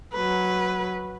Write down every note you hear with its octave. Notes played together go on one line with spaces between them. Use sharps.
F#3 B4